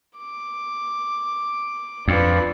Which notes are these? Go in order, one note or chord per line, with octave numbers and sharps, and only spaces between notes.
D6
F2 D4 B4